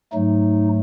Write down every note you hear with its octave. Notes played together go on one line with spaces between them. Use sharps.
G#2 F#3 A3 D#4